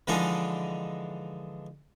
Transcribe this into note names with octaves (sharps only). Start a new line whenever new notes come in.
D3 E3 F3 G#3 D4 D#4